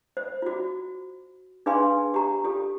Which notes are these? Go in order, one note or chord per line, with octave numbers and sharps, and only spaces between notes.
C5
F4 F#4
D4 G#4 B4 F5 G#5 C6
G4 A#5
F4 G4 A4